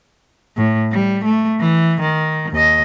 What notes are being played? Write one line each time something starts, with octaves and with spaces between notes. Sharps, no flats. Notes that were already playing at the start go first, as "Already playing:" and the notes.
A2
G3
A3
E3
D#3
D#2 D#5